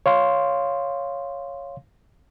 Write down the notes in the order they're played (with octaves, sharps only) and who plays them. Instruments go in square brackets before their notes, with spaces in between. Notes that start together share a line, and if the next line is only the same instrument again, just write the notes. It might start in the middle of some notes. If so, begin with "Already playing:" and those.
[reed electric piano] C#5 F5 C6